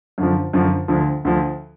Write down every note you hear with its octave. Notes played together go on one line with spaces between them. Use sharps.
F#2 D3 F3
F#2 D3 F3
D2 D3 F3
D2 D3 F3